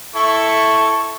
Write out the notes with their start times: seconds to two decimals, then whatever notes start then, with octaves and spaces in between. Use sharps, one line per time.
0.15 E4 A4 C#6